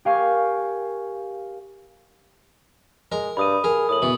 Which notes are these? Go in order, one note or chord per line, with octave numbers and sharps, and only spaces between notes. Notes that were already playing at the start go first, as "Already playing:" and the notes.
G4 A#4 F5 G#5 C#6
G#3 A#4
G2 B5 D#6 D#7
G#4 A#4
A2 D#6 F#7
B2 E3 F#7